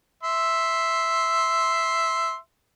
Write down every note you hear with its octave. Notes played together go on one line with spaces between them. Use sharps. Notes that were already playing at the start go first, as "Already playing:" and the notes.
E5 C6